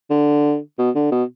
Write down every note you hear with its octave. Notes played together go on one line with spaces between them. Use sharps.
D3
B2
D3
B2